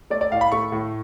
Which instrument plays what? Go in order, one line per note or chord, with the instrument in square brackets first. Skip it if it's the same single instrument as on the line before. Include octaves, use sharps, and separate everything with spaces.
[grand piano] A3 D5
D5
A2 F5
B5
A3 C#6
A2